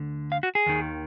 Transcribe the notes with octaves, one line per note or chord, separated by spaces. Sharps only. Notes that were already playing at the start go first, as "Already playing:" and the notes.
Already playing: D2 D3
F5
F#4
G#4
D#2 D#3